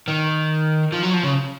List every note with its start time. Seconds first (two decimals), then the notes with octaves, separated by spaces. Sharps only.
0.08 D#3
0.92 F3
1.03 F#3
1.13 F3
1.23 C#3